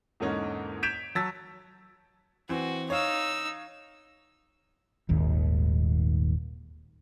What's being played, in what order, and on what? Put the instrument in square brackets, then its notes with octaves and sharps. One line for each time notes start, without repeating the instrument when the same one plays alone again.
[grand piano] E2 G#2 D3 A#3 C#4 D#4
G6 G#6 B6 D7 E7 F7
F#3 A5 E6 A6 B6
[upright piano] E3 C4 [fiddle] F#4
[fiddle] D#4 E6 [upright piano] C#5 F5
[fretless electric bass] D#1 G#1 D#2